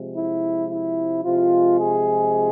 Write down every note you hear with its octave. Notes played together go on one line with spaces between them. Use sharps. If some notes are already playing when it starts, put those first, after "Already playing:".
Already playing: C3 F3 G#3
E4
E4
C3 F3 G#3 F4
G#4